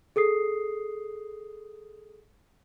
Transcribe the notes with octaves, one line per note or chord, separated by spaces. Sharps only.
G#4 A4 D#6 C7